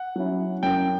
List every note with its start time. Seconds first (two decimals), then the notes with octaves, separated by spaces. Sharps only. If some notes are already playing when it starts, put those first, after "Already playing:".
Already playing: F#5
0.16 F#3 C#4 E4
0.63 F#2 G5